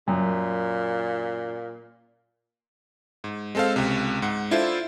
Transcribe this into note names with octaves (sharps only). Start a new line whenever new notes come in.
F#2 A#2
G#2
G#3 C4 A4 C5 F5
C#2 C3
G#2 F#5
D4 E4 F4 A4 C5